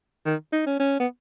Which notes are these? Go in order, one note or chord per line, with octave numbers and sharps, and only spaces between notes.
D#3
D#4
C#4
C#4
B3